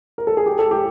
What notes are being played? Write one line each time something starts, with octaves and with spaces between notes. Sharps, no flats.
A#4
A4
G#4
G4
A4
G4